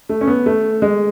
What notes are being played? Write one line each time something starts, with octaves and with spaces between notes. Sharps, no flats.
A3
C#4
B3
A3
G#3